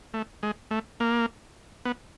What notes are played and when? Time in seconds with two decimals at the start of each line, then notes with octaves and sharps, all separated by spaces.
0.14 A3
0.43 G#3
0.71 A3
1.00 A#3
1.85 B3